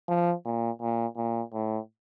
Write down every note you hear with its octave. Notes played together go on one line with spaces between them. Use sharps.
F3
A#2
A#2
A#2
A2